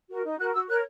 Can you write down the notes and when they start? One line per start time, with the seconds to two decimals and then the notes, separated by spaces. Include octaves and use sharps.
0.09 F#4 A#4
0.24 D#4
0.38 F#4 A#4 F#6
0.53 F#4 E6
0.69 A#4 C#5 F#6